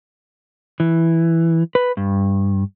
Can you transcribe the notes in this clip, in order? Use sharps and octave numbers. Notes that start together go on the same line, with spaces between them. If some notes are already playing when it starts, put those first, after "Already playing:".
E3
B4
G2